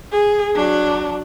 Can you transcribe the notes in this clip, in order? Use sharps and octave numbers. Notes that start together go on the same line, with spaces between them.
G#4
F#3 D4